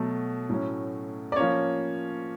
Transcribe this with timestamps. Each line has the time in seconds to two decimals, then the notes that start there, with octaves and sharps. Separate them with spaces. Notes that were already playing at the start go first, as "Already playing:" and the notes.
Already playing: B2 F#3 A3
0.49 A2 F#3 A3 C#4
1.32 D5
1.36 F3 A#3 C#4 C#5